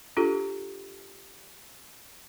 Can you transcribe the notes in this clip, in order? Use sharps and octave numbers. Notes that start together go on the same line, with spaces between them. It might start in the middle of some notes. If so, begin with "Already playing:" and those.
D4 F4 G4 A4